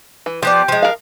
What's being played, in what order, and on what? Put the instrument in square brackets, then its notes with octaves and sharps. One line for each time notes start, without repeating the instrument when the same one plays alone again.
[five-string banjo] E3
[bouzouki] F3 B3 D5 [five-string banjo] G4 [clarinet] G5
[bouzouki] F3 G#3
[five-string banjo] A#4 F5